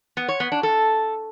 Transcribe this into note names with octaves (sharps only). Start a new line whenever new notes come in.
B3
C#5
B3
D4
A4